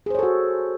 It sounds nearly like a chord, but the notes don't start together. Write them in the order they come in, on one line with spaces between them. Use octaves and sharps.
G#4 C5 C#5 A4 F#4